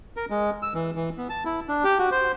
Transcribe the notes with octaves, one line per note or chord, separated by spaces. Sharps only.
A#4
G#3
E6
E3
E3
B3
A5
E4
D4
G4
F#4
C5